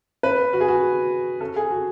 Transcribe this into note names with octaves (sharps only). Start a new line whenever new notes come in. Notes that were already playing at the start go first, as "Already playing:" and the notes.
B4
F#4
G#4
F#4
A4
G#4
F#4